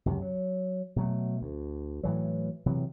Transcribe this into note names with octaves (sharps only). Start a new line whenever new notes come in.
C#2 F#2 C3
F#3
B2 F#3 A3
D2
A2 E3 F#3
C3 E3 F#3